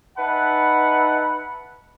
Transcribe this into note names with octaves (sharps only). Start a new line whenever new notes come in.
D#4 B4 E5 F#5 A5 B5